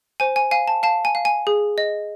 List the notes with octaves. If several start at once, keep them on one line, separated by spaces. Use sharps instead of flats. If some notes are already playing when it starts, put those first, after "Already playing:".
C5 G#5
G#5
F5 G#5
A5
F5 A5
G#5
F5
G#5
G#4
D#5